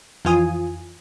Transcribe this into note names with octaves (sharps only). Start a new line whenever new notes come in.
F2 E3 F4 G#5 D#6